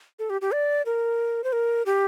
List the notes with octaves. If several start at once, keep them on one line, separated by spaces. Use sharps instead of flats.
A4
G4
G4
D5
A#4
C5
A#4
G4